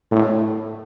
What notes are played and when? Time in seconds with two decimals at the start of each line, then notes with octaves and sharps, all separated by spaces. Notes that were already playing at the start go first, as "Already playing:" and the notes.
0.12 A2